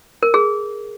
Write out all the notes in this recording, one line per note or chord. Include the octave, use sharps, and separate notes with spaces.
A#4
G#4